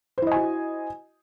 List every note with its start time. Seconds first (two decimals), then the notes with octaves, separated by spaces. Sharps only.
0.18 C5
0.22 E4
0.27 D#5
0.32 G#5
0.36 F#4